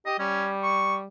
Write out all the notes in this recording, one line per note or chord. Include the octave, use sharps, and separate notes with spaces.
G4 D#5
G3 C#4
C#6